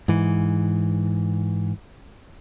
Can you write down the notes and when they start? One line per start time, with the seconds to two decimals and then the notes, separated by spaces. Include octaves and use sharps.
0.08 G#2 E3